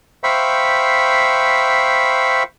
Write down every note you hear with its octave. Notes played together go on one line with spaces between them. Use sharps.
C5 E5 F5 G5 B5 C#6